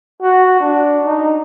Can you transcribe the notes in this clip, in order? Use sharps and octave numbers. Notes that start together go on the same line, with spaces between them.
F#4
D4
D#4